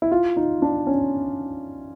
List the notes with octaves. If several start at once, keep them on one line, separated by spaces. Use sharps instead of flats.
E4
F4
D#4
D4
C#4